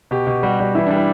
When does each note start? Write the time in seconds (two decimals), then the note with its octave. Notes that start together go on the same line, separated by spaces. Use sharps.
0.11 B2 G4
0.27 B2
0.43 G3 F#4
0.60 G3
0.75 E3 E4
0.87 G3 D4
0.97 E4